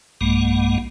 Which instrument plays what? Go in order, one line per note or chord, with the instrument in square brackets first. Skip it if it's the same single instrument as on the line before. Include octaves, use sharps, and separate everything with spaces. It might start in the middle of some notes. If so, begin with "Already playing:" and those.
[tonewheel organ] B1 G2 G#3 A#3 F#5